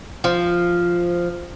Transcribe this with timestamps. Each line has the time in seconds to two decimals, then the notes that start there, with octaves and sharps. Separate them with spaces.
0.24 F3